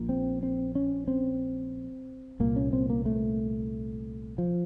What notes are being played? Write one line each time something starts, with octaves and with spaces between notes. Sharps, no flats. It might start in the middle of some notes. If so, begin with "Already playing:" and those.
Already playing: A#1 A#2
C4
C4
C#4
C4
C2 A#2 A#3
C#4
C4
A#3
A3
F3